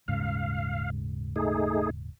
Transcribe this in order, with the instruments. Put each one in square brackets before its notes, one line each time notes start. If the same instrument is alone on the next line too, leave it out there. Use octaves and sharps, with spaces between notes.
[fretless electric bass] D#1 G#2 C#3 [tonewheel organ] F5
[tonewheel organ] A3 D#4 G#4